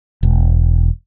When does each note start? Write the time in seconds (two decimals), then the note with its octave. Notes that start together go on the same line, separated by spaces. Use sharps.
0.23 E1